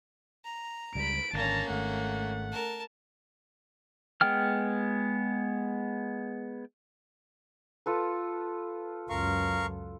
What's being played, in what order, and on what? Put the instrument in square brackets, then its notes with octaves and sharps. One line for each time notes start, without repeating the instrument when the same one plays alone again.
[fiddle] A#5
[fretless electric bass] C#2 G3 [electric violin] B5 D7
[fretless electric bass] G#1 D3 [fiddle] A#3 C#4 [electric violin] A5 A#5
[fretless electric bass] G#1 [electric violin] A3 F#5
[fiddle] A#4 A5
[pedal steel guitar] G#3 B3 G5 F6
[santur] F4 A4 B4
[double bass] C#2 F#2 [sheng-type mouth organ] A#4 F5 C#6